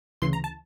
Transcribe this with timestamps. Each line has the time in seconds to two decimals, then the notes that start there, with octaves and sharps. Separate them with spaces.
0.22 D2 C#3 E3 C6
0.33 A#5
0.44 A5